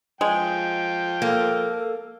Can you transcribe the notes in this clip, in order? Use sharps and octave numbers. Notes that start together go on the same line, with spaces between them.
F3 G#3 G5
A#3 A4